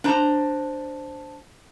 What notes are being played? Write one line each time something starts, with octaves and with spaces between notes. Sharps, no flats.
D4 C5 A#5